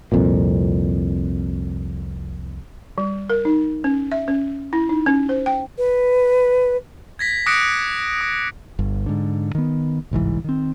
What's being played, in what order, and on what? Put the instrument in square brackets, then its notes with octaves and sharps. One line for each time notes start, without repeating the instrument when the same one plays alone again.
[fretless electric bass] C2 F2 A#2
[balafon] G3
A#4
D#4
C#4
E5
C#4
E4
D#4
C#4
C5
G5
[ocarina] B4
[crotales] G#6 A#6 B6
D6 D#6 F#6 A#6 C#7 D7
D#6
[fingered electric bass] G1 G2
G#2 D3
D#3 B3
G1 C2 G#2 E3
D#3 C4